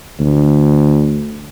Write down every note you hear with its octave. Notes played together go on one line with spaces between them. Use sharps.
D2